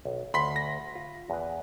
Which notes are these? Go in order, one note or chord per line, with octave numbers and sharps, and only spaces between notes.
B1
D2 B5 C6 B6
A#6
F4
E2 B4